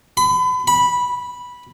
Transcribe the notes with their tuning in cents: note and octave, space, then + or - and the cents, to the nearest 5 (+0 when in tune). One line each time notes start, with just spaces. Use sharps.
B5 +35
B5 -10